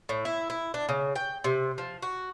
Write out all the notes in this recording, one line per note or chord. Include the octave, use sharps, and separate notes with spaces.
A2
E4
E4
D4
C#3
G5
C3
F3
F#4